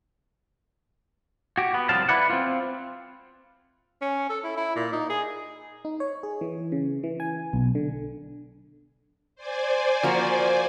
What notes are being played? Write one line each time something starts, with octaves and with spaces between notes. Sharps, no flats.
F#4 G4
B3
C2 D3 F3 F#3 F5 A5
E4 B4 D5 F#5
C4 F4
C#4
A4
E4
E4
A#2
D#4
G#4
D#4
C#5
G#4
E3
C#3
E3
G#5
B1
D3
C5 D5 G#5
F3 A#3 F#4